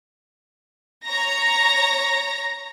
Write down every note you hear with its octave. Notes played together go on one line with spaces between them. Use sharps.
C#5 A#5 A#6